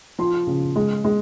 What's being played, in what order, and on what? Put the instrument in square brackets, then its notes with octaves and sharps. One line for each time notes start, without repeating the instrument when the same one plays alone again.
[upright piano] F3 C6
C#3
G#3
G#3